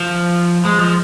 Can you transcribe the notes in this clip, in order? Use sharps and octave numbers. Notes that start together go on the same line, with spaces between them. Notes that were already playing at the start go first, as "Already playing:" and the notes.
Already playing: F3
G#3
F3